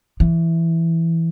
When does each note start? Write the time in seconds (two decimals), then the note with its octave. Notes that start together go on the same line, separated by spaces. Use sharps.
0.20 E3